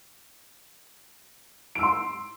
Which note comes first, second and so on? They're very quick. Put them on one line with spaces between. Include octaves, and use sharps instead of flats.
D7 E6 C6